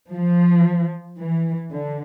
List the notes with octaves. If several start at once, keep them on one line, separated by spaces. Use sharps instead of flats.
F3
E3
D3